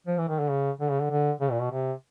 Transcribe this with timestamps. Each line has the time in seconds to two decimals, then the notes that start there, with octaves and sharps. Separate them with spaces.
0.06 F3
0.18 E3
0.28 D#3
0.39 D3
0.50 C#3
0.80 D3
0.90 C#3
1.00 D3
1.10 D3
1.41 C#3
1.51 A#2
1.61 B2
1.71 C3